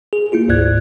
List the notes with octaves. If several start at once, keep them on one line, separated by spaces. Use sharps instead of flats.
G#4
A#3 E4 F4 G#4
G1 D2 G#2 D5 F#6 G#6